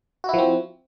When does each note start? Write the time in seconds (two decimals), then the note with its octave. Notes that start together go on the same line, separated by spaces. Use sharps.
0.24 F#4
0.29 E4
0.34 F3
0.38 C4